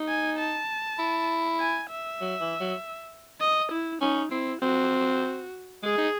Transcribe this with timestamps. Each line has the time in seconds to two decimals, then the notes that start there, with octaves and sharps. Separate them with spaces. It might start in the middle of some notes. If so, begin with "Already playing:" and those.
Already playing: D#4
0.09 G#5
0.38 A5
0.99 E4
1.60 G#5
1.90 E5
2.21 F#3
2.41 E3
2.60 F#3
3.41 D#5
3.72 E4
4.01 C#4 D#4
4.31 C4 E4
4.62 C4 F#4
5.83 G#3 G#4
5.98 D#4